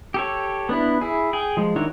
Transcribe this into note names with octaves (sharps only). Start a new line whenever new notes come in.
G4 A4 C#5
B3 D4 E4
E4 G#4
G#4 G5
F3 G#3
D#3 D4 E4 F#4 C#5